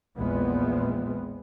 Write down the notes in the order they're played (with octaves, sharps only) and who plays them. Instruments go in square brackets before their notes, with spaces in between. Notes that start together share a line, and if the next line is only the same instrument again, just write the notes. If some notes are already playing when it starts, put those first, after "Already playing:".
[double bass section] A#1 E2 A#2 G#3 B3 C4